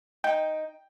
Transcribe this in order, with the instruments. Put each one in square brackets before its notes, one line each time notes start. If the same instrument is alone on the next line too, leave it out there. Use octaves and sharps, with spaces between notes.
[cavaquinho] D#4 [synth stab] G5